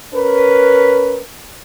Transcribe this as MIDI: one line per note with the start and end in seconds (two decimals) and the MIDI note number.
0.14 1.21 61
0.14 1.21 70
0.14 1.21 71